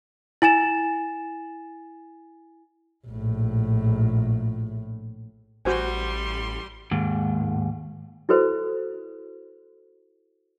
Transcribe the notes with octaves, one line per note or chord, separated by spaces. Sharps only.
E4 G#5 A6 E7
A#1 A2
A1 G3 F#4 C5 G#5 C6
D#2 G#2
E4 F#4 A4 B4 C5